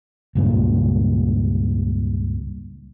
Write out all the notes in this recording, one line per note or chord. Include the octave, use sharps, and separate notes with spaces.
C#2 G2 A#2